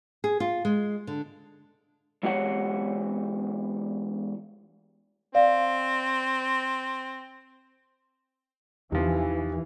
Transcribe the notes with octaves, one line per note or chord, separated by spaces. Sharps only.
G#4
F4
G#3
D3
E2 G#3 F#4 G4 C#5 F#5
C4 D5 F5
E2 C3 E3 F3 D#4 G4